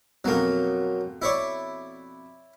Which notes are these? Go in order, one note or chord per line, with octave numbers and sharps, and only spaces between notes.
F2 B2 F#3 A#3
E4 C#5 D5